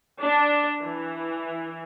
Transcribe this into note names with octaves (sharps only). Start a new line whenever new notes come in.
D4
E3